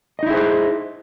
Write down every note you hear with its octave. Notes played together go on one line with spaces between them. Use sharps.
D#4 E4 G#4 C5 D#5